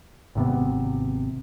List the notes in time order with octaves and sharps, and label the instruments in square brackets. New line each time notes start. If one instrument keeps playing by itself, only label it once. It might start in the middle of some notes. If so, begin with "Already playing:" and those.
[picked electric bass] G#1 C3 B3